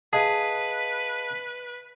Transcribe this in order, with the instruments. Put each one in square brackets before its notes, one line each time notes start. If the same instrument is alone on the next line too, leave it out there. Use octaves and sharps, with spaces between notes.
[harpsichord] G#4 [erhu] B4 [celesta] D#5 F5 A5